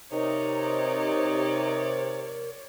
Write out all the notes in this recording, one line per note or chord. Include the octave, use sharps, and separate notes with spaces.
C3 D#4 A#4 C#5 D5